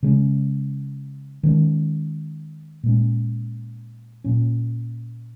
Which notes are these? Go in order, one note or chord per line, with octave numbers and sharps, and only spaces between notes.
C#3 G#3 C#4
D#3 G#3 C#4
A#2 G#3 C#4
A#2 F#3 A#3 C#4